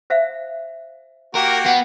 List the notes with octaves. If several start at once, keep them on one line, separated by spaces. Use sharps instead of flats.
C5 E5 F5
A#3 F#4 G4 A#4
B3 F#5